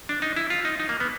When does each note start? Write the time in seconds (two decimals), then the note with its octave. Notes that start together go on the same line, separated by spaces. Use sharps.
0.09 D4
0.22 D#4
0.36 E4
0.50 F4
0.65 D#4
0.80 D#4
0.89 A#3
1.00 B3